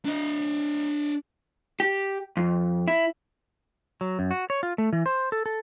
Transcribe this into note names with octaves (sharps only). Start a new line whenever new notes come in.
D4 D#5
G4
F2
E4
F#3
F#2
F#4
C#5
F4
A3
E3
C5
A4
A4